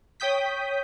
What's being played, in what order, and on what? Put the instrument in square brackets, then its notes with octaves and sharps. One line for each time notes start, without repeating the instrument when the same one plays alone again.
[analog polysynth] C#5 G5 D#6 G6 B6